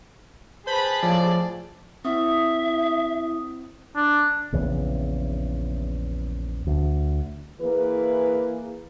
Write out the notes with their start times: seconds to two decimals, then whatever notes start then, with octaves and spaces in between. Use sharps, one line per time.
0.67 G#4 B4 C5 A5 B5
1.03 A2 C#3 F3 D5
2.05 C4 E4 E5 D#6
3.96 D4
4.52 A#1 E2 C#3 E3
6.67 D2
7.61 E3 A#3 G#4 B4